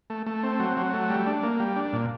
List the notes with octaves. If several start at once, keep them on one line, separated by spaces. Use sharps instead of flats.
A3
A3
C4
F#3
F#3
A3
G3
D4
A#3
G3
D4
A#2